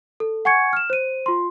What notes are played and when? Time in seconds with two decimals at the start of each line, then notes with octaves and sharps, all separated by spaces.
0.20 A4
0.45 F#5 G#5 C#6 G#6 C#7
0.73 F6 E7
0.90 C5 D#7
1.26 F4 C6